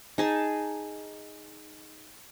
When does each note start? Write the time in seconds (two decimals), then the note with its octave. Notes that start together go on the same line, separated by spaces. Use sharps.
0.18 D#4 G#4 A5